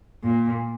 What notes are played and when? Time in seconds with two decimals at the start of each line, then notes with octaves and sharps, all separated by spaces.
0.24 A#2